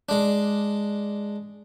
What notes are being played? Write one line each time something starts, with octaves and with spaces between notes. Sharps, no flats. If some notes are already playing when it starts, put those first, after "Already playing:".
G#3 D4